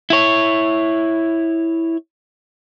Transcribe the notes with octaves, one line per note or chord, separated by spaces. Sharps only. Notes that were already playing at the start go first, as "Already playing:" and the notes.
E4 C#5